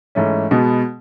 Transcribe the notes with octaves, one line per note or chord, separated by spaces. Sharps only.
G#2 E3 A3 C#4
B2 G#3 B3